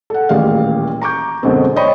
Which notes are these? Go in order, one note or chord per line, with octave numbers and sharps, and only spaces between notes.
A4 F#5
D#1 A1 A#2 G#4 F5
A#5 C#6 D6 G6
F#2 B2 D3 G#3 C4
C5 C#5 D#5 G5 B5 C#6